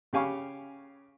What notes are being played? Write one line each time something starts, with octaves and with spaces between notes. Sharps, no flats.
C#3 G4 F5 G#5 B5 C#6